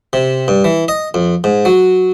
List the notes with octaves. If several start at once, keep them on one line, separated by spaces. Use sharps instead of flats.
C3
G2
E3
D#5
F2
G#2
F#3